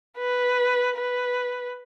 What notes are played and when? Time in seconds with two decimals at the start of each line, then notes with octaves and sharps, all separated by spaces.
0.17 B4
0.97 B4